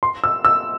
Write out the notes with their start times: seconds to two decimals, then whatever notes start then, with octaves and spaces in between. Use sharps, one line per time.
0.03 C6
0.24 E6
0.45 E6